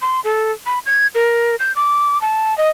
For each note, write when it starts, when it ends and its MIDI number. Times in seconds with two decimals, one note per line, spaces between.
0.02 0.20 84
0.24 0.52 69
0.66 0.79 83
0.86 1.07 92
1.15 1.56 70
1.60 1.74 91
1.76 2.20 86
2.21 2.57 81
2.58 2.70 75